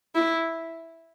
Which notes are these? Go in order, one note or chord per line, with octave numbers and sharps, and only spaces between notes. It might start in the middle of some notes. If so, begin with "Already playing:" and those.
E4